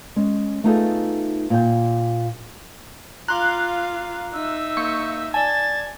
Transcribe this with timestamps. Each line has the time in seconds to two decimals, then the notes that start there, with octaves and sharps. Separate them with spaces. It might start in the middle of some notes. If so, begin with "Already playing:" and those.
0.16 G#3 C#4
0.64 A3 B3 D#4 F4 G#4 A4
1.50 A#2 G5
3.28 F4 F5 A#5 C6 D6 F#6
4.33 D#4 E5 E6
4.77 A#3 C#6 G6
5.34 D5 G#5 A5 G#6 A6